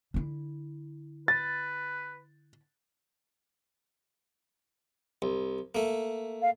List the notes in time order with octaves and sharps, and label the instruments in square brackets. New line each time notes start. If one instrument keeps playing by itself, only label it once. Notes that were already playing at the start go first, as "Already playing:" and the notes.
[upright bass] D3 E4
[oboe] B4 [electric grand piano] A6
[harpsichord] C2
A3 A#3
[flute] F5